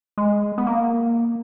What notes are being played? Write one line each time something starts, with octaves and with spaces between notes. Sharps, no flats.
G#3
B3
A#3